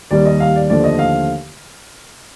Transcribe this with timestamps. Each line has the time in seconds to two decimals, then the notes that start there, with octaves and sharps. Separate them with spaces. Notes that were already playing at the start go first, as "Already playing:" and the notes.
0.11 D#2 D#3 G3 D5
0.25 D#5
0.40 F5
0.56 D5
0.70 D#2 D3 F3 A3 D5
0.84 D#5
0.99 F5